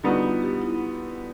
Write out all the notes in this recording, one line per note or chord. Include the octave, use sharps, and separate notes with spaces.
D3 G3 B3 D#4 F4 F#4
F4
G4
E4